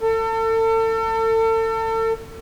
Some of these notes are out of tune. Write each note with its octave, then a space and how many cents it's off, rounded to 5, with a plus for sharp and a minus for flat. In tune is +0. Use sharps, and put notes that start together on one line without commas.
A4 +35